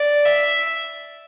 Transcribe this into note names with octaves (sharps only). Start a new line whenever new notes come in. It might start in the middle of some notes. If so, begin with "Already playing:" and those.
Already playing: D5
E5